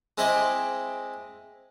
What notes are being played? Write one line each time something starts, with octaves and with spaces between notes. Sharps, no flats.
G#3 C4 E4 D#5 G5 D6